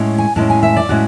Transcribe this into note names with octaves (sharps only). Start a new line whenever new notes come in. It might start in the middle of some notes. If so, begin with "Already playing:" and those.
Already playing: A2 G#3 C#4
G#5
A2 G#3 C#4 A5
G#5
E5
D5
A2 G#3 C#4 F#4